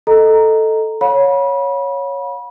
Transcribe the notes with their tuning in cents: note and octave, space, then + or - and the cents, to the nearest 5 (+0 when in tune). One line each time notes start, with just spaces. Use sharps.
A4 +0 D#5 +0 A#5 +0
C#5 +0 F5 +45 B5 -30